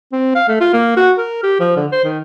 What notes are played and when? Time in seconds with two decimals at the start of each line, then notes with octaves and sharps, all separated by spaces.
0.12 C4
0.35 F5
0.48 A3
0.61 F4
0.73 A#3
0.97 F#4
1.18 A#4
1.43 G4
1.60 F3
1.76 D3
1.92 C5
2.04 D#3